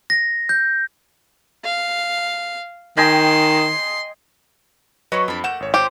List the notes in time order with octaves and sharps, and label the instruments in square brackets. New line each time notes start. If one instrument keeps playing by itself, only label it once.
[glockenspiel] A#6
G6
[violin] F5
[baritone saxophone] D#3 [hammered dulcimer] D#5 G5 G#5 [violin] C6
[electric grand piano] F#3 B4 D#5 [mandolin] F#4 C#5
[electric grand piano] F2 [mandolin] D4 B5
[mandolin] A3 A#3 G6 [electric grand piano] F#5 E7
[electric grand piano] G#1 C#5
[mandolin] F4 C5 [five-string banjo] G4